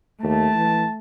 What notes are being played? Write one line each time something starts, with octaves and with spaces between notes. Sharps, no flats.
D#2 A3 A5
E3